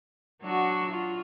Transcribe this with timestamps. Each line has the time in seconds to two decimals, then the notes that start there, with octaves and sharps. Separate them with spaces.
0.42 F#3 D4 F#4
0.90 F4